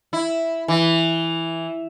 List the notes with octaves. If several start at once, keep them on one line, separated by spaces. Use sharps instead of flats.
E4
E3